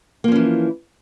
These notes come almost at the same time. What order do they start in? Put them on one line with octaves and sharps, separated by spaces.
A#3 F3 C#4 E3